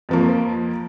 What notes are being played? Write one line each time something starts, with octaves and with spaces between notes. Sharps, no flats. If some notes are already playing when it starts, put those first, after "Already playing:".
F2 F3 A#3